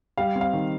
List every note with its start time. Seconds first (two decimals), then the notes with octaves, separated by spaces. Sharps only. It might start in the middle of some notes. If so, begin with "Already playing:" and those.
0.18 G3 F5
0.35 C4
0.41 F5
0.53 D#3